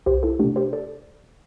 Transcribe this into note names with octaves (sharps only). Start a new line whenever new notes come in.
C2 G4 C5
E4 A4
C3 A3 D4 G4
G4 C5
A4 D5